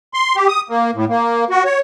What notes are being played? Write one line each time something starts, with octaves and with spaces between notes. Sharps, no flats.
C6
G4
D#6
A#3
A2
A#3
F#4
C#5